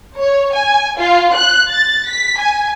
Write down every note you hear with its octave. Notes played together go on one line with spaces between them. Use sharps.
C#5
G#5
F4
F#6
A6
B6
G#5